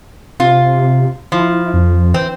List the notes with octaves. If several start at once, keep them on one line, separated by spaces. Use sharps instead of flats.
C3 F4
F3 E4
F2
E3 C4